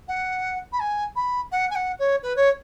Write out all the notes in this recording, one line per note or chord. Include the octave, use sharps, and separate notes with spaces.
F#5
B5
G#5
B5
F#5
G#5
F#5
C#5
B4
C#5